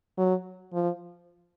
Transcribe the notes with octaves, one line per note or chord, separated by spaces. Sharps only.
F#3
F3